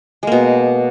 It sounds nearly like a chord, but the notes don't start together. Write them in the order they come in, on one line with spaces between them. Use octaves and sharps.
G#3 A#3 B2